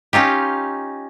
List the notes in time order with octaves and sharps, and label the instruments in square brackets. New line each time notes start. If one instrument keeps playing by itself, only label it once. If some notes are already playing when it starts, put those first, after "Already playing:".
[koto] C#4 D#4 F4 G4